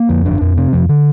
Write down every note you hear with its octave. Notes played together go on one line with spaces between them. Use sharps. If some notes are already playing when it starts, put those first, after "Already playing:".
Already playing: A#3
F2
G1 D4
F2
C3 C4
F2 F3
D3